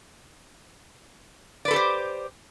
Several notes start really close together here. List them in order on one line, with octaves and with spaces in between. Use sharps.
D5 B4 A4 G4 C5